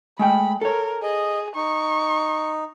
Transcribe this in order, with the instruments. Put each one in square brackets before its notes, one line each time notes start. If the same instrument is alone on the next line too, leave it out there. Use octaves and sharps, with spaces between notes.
[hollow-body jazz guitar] G#3 A3 G5 [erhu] B5
[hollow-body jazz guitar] A4 C#5 [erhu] A#4
[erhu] G#4 [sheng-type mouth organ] D#5
[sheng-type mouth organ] D#4 [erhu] C#6